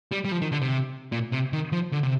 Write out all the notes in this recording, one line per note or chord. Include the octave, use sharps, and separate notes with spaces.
G3
G3
F3
D#3
D3
C3
A#2
C3
D#3
F3
D3
C3